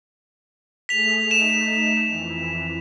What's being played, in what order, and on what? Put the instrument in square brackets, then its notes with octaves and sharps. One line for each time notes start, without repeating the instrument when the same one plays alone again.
[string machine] A3 G#4 [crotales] B6 F7
[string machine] A3 D#4 [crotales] E7
[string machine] F2 E3